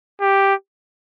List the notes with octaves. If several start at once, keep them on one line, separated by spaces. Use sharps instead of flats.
G4